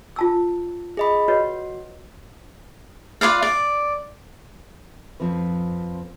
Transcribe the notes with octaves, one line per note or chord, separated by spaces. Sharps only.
F4 A5 E6
G#4 D#5 B5
F#4 B4 C#5 D#5
F4 B4 D5 F5
D5
F2 F3 C4 B4